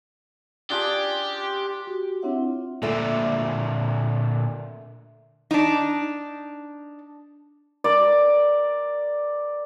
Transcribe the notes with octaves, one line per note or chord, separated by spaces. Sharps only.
D4 F4 G4 G#4
F#4 G4
C4 D4 E4 C#5 E5 F#5
F4
A#2 D3 A3 G#4 E5
D4 D#4
A#4 D5